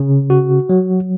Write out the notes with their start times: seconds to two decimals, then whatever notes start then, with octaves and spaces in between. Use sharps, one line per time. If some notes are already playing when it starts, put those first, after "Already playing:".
Already playing: C#3
0.30 F#4
0.69 F#3